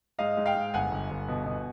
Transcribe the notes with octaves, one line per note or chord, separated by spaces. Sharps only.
G#2 D#5 F5
G#2
F5 G5
G#2
G1 F#5 G#5
G1
G1
B2
B2